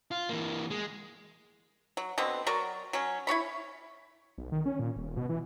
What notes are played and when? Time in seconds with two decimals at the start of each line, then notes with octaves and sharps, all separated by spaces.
0.11 F4
0.30 E3 A#3
0.70 G#3
1.97 F#3
2.18 B2 D3 B3 C4
2.47 F#3 F#4 A#4 D5
2.93 F#3 C#4
3.27 E4 F#4 C#5 B5
4.38 B1
4.52 D#3
4.66 C#4
4.79 A#2
4.96 D#1
5.17 B2
5.29 E3